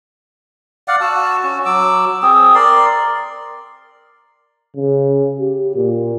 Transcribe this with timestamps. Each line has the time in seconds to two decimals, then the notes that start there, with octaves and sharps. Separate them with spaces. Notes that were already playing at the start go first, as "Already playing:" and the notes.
0.88 D5 F5 F#5
1.01 F#4 A5 E6
1.43 C#4 F#4
1.65 F#3 D6 E6
2.22 C4 G#4
2.55 A#4 D5 C6
4.75 C#3
5.39 G4
5.76 A#2